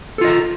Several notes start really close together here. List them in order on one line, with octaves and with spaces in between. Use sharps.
A4 F4 D#5 A#5